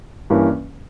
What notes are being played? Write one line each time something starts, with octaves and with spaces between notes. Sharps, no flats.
G2 E3 A#3 C#4